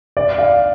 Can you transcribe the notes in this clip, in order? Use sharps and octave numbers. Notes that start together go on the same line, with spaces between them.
D5
F5